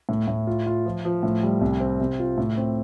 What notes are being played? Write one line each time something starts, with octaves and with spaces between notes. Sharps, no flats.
A2
A2
F4
F4
F3
F3
A2
G3
C2
C4
C3
F4
A2
C4